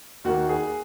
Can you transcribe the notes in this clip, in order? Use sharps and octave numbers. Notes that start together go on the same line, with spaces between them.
D#2 D#3 A#3 F#4
G#4